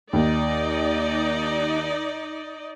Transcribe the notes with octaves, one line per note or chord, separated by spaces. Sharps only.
D#2 D#4 D5 D#5